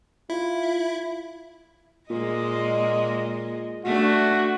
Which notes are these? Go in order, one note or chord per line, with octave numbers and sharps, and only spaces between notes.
E4 F4
A#2 G#3 A#3 D#5
A3 D4 F#4